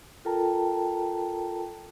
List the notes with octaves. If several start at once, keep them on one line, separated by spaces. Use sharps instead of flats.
F4 A4 A#4 G5 A5 A#5